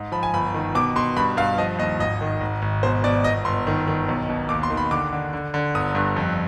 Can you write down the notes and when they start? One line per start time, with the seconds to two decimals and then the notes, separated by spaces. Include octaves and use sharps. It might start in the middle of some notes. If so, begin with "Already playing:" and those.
Already playing: G#2
0.12 F3 B5
0.23 G#5
0.34 G1 B5
0.54 D#3
0.75 B2 D6
0.96 B2 C6
1.17 G2 B5
1.37 G2 F5
1.58 F3 D#5
1.78 D#2 D#5
1.99 G#1 D#5
2.21 D#3
2.41 G#1
2.62 G#1
2.83 B2 C5
3.04 B2 D5
3.24 G1 D#5
3.45 G1 C6
3.67 D#3
3.88 D#3
4.08 B1
4.29 B2
4.49 D#2 D6
4.63 C6
4.70 D#3
4.77 B5
4.91 D3 D6
5.13 D3
5.33 D3
5.54 D3
5.75 G1 D#6
5.95 G2
6.16 F2